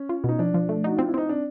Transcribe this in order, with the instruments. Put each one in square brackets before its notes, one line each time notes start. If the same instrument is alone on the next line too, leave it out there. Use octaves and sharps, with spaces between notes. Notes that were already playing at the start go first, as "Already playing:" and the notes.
Already playing: [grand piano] C#4
[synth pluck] F4
[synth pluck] B2 [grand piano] D#4
[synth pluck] F3 [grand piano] D4
[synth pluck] F3
A3
[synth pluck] D#4 [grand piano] F#4
[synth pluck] C4 [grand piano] F4
[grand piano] E4
[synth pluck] C4 [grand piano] D#4
[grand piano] D4